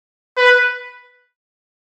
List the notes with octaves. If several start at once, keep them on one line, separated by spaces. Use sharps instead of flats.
B4